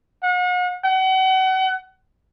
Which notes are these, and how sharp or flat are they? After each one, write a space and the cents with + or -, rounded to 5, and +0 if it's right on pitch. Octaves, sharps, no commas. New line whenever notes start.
F#5 -40
F#5 +35